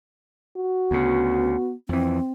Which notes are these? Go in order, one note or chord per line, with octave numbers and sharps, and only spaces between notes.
F#4
D2 C#3 B3
F2 E3 C4